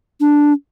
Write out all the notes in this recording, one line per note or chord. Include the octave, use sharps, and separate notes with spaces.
D4